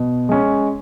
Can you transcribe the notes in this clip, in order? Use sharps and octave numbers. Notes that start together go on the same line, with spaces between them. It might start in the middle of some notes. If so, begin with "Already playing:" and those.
Already playing: B2
G#3 C#4